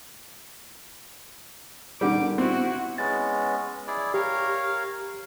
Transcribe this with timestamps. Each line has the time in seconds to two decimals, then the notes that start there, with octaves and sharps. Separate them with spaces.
2.01 D3 D#3 G3 D6
2.38 C4 E4 F#4
2.98 G#3 B3 C#4 A6
3.88 E4 G#4 D5
4.14 G4 A#4 C#5 F5